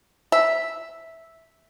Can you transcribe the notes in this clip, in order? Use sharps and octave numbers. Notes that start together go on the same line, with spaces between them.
E5